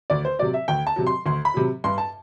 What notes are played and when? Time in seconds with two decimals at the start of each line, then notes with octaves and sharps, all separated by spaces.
0.10 D2 D5
0.25 C5
0.39 C3 F#3 D5
0.54 E5
0.68 D2 G5
0.87 A5
0.96 C3 F#3
1.07 C6
1.26 D2 C6
1.45 B5
1.54 C3 F#3
1.84 G2 C6
1.98 A5